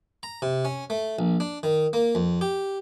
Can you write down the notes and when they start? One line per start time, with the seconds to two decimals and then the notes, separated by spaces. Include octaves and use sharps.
0.23 A#5
0.42 C3
0.65 C#4
0.90 A3
1.19 A#1
1.40 D4
1.63 D#3
1.93 A#3
2.15 F2
2.41 G4